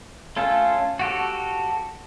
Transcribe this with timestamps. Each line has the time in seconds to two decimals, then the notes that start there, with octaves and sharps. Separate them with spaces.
0.36 A3 C#4 F4 A4
0.99 F#4 G4 A4